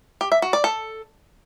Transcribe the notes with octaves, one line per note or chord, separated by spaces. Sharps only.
G4
E5
F#4
D5
A4